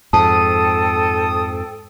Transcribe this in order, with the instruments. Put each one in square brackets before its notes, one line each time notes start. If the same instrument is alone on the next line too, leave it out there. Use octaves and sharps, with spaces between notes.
[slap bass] F2 G#2 [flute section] A4 G5 [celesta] A5 [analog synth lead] D#6